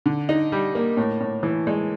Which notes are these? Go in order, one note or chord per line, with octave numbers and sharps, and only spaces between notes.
D3
D#4
G3
A#3
A2
A2
E3
G#3